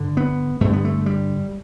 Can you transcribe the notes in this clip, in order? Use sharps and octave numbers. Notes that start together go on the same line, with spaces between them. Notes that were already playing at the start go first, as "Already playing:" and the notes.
Already playing: G2 D3
B3
G2 D3 A3
B3
A3
G3